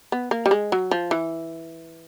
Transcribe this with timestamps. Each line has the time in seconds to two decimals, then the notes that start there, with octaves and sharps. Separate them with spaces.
0.12 B3
0.31 A#3
0.46 G3
0.51 G#3
0.72 F#3
0.91 F3
1.11 E3